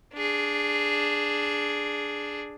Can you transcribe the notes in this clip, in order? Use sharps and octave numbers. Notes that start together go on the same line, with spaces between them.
D4 G#4